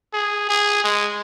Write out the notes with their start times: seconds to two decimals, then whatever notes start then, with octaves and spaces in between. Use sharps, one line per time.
0.14 G#4
0.49 G#4
0.84 G#3